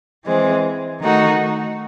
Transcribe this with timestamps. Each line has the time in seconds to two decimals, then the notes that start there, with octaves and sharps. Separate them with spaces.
0.26 E3 G#3 C4
1.01 D#3 A3 D#4 F#4